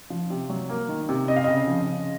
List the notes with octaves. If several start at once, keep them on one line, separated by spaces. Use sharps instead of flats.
F3
C3
F#3
A#3
D#3
C3
C4 D#5
F5
C#3 D#5
F3
C#3